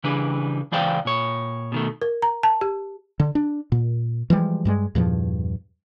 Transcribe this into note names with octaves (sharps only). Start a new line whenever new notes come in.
C#3 E3 G3 D4 B4
C#2 E3 C5 D5 F5 G5
A#2 C#5
B2 D#3 A3
A#4
A#5
A5
G4
D3
D4
A#2
E3 F3 G3 G#3
G2 G3 G#3
E2 G2 A#2 F3